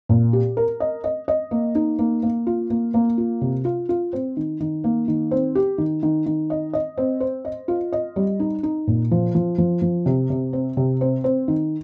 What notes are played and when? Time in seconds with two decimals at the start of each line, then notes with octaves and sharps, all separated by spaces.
0.09 A#2
0.33 G4
0.57 A#4
0.80 D#5
1.04 D#5
1.28 D#5
1.51 A#3
1.75 D#4
1.99 A#3
2.23 A#3
2.47 F4
2.70 A#3
2.94 A#3
3.18 F4
3.41 C3
3.65 F4
3.89 F4
4.13 C4
4.37 D#3
4.60 D#3
4.84 A#3
5.08 D#3
5.31 C4
5.55 G4
5.78 D#3
6.03 D#3
6.26 D#3
6.50 D#5
6.73 D#5
6.97 C4
7.20 C5
7.45 D#5
7.68 F4
7.92 D#5
8.16 G3
8.40 D#4
8.63 D#4
8.87 A#2
9.11 F3
9.35 F3
9.58 F3
9.82 F3
10.06 C3
10.30 C3
10.53 C4
10.77 C3
11.01 C4
11.24 C4
11.48 D#3